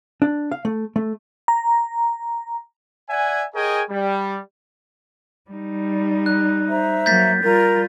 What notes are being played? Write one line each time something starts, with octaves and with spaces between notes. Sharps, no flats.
D4
F5
A3
A3
A#5
D5 E5 F#5 G#5
G#4 A#4 C#5 D#5 G5 G#5
G3
G3 D#4
F#6
C5 E5 A#5
F#3 A#3 G6 A6 B6
G3 F4 A#4